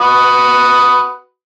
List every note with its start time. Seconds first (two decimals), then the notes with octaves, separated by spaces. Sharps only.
0.01 F#4 B4 D#6